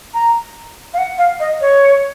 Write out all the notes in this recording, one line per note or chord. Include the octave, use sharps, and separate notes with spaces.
A#5
F5
F#5
F5
D#5
C#5